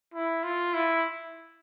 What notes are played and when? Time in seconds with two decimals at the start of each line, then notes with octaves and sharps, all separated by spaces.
0.14 E4
0.43 F4
0.74 E4